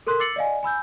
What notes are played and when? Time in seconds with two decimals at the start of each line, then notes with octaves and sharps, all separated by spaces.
0.07 A4 A#4 C6 F#6
0.20 D6 E6 A6 C7 C#7 F#7
0.36 D5 D#5 F5 G#5
0.63 G#5 B5 E6 G6